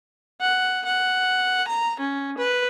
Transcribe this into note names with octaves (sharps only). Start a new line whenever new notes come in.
F#5
F#5
A#5
C#4
B4